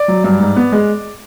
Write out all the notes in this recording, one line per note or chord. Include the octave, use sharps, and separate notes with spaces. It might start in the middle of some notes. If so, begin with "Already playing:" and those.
Already playing: D5
F#3
G2
G#2
B3
G#3